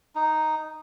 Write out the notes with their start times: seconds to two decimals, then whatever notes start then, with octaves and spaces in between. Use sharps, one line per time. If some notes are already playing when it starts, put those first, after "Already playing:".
0.16 D#4